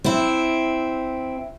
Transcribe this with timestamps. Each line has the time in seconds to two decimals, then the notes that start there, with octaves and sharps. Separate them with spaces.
0.04 C4 E4